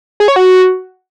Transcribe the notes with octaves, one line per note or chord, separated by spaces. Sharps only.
G#4
C#5
F#4